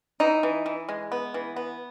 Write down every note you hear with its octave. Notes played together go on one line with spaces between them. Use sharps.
E3 D#4
E3
E3
G#3
B3
E3
B3